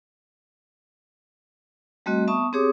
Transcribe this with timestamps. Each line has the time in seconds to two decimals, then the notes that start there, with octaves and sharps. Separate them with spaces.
2.06 G3 A3 C4 F#4 D#5
2.28 B3 E5 A5 C#6 D#6
2.53 C4 G4 G#4 C#5 D6 D#6